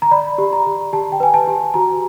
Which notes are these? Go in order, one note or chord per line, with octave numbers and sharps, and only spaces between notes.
A#5
D5 B5
G4
A#5
G4
G4 A5
G5
B4 G#5
A5
G4
F#4 A#5